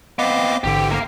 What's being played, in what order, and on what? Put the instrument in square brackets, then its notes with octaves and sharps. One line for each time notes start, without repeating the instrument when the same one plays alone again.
[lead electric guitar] B3 C4 [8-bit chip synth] D#5 F5 D6
[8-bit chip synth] A1 G#2 D3 [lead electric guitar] G4
[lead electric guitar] A#3 F5